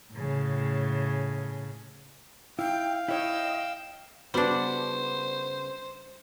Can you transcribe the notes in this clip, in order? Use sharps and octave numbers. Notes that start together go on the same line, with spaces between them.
A2 C#3
E4 F5 G5
E4 C#5 D#5 G5 E6
C#3 G3 B3 D4 F#4 C5